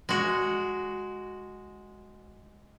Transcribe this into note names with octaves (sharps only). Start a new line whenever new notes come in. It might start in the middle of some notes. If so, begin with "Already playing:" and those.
G#3 F#4